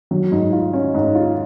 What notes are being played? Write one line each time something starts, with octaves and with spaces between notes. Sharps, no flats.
F#3
G#2
F4
C#4
G#2
F4